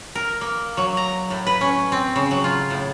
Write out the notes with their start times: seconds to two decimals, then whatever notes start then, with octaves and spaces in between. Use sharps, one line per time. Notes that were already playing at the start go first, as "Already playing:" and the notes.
0.15 A#4
0.41 A#3
0.77 F#3
0.97 A#5
1.30 A2
1.47 B4
1.61 C#4
1.92 C4
2.16 C#3
2.31 F#3
2.44 F4
2.70 A2